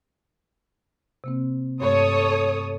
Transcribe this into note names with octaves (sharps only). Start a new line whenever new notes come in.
C3 A#3 C4
G2 A3 A4 C#5 D#6